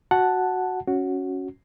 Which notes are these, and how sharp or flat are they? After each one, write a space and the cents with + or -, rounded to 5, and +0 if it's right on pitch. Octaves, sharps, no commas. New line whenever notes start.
F#4 +0 F#5 +0 A5 +0
C#4 +0 F#4 +0